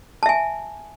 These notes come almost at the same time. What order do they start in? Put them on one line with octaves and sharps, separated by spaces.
A5 E5 G#5